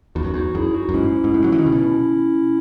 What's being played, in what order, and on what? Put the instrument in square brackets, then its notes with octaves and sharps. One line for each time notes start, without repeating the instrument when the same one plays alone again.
[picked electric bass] E2 [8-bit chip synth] D#4 F#4
[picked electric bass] F#2
[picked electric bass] E2 [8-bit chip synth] D#4 F#4
[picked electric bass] F#2 [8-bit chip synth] E4 G#4
[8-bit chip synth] D#4 F#4
[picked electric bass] F#2
[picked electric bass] G#2 [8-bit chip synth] C#4 E4
[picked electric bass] G#2
A2
F#3
E3
D#3
C#3
B2